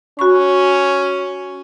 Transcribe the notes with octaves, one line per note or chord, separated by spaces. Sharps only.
C#4 F#4 B5 C#6